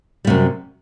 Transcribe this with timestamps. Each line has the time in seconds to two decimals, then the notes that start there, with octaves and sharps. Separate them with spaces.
0.25 G3
0.27 C3
0.30 F#2